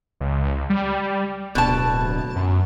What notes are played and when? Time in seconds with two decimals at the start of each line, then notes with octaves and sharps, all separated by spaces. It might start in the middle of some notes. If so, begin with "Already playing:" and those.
0.21 C#2
0.70 G3
1.55 D1 B2 A5
2.36 F#2